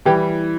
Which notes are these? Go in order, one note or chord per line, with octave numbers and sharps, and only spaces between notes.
E3 G3 G4